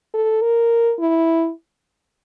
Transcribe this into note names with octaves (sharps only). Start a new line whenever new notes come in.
A4
A#4
E4